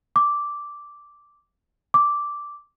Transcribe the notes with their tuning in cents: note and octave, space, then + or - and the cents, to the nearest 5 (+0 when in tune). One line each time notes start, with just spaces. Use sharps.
D6 -5
D6 -5